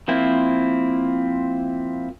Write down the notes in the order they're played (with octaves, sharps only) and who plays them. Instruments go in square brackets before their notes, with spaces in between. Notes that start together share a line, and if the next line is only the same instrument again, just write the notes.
[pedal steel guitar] F3 A#3 C4 E4